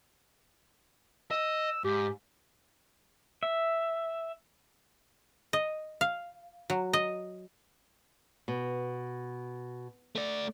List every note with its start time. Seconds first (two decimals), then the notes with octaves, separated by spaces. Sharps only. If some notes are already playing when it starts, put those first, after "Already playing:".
1.31 D#5 E6
1.84 G#2 G4
3.43 E5
5.53 D#5
6.01 F5
6.70 F#3
6.93 D#5
8.48 B2
10.15 A3 D5